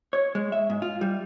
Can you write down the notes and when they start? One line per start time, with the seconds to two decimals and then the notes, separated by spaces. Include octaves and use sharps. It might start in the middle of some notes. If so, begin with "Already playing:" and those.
0.13 C#5
0.35 G#3
0.52 E5
0.70 G#2
0.82 F4
1.01 G3